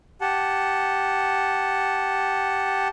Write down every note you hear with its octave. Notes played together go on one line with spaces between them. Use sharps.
G4 F#5 A5